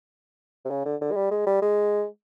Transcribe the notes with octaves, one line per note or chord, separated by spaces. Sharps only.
C3
C#3
D3
D3
G#3
G3
G#3
G3
G#3